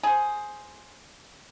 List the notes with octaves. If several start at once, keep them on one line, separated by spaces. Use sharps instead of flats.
G#4 C5